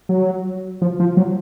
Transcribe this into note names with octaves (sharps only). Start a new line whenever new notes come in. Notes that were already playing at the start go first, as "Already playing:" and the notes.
F#3
F3
F3
F#3